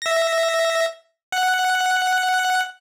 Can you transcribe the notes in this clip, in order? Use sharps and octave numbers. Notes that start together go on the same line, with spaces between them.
E5 A#6
F#5 F#6